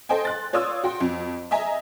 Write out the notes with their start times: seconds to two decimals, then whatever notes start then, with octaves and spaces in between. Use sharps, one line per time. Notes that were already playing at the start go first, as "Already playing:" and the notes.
0.09 A4 C5 D#5 G5 G#5
0.25 C6 F#6 A6
0.53 F4 C#5 D5 C6 D#6 E6
0.84 F#4 G5 C6
1.00 F2
1.51 D#5 E5 G#5 A#5